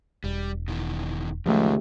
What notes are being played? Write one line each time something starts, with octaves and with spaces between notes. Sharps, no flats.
E1 G3
B2 D#3 E3
C#2 F#2 D#3 F3 A3 G4